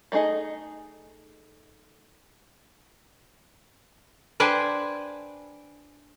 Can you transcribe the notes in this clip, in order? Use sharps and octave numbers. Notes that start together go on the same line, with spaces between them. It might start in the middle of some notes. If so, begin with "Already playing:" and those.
G3 A3 D#4 G#4 D#5
D4 B4 C5 G5 G#5